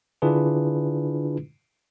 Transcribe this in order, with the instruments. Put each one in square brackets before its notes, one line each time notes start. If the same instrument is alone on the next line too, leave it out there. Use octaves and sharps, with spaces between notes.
[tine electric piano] D3 D4 E4 F4 G#4 B4